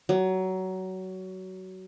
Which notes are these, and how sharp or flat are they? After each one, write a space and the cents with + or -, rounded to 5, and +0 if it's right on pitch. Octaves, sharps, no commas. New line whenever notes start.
F#3 +20